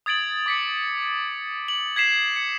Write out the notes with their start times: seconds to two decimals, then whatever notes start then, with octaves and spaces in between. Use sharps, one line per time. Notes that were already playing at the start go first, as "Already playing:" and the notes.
0.06 D#6 G#6 A6 D7 F#7
0.46 D6 B6 C#7
1.68 F#7
1.96 G#6 B6 C7 E7
2.36 C#7